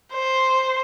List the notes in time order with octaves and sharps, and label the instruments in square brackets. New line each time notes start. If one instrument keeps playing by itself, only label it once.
[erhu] C5